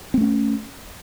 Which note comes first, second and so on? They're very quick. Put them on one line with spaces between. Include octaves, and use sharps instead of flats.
C4 A3 C#4